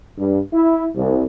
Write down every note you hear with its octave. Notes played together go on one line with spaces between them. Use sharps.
G2
E4
C2